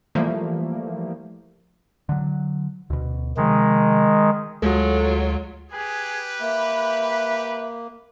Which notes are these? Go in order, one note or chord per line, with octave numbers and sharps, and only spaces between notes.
E3 F3 G3 A3 A#3
D3 F#3
D2 B2
C3 D#3 F3 G#3
D2 F#3 G#3 F4 F#4 A4
G4 G#4 B4
A#3 E5 B5